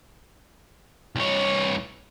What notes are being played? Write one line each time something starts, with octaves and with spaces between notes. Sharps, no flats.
C2 C#5